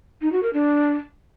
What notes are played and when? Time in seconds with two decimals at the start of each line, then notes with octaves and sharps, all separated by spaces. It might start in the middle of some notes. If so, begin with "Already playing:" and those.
0.22 D#4
0.32 F#4
0.43 A#4
0.54 D4